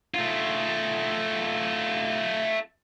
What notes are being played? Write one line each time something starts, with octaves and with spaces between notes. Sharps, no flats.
A3 F4